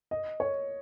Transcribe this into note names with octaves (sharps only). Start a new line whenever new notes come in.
D#5
C#5